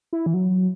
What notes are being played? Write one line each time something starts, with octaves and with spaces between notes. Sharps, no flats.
E4
E3
F#3